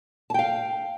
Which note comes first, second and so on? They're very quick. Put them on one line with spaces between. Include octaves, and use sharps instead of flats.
A5 G5 F5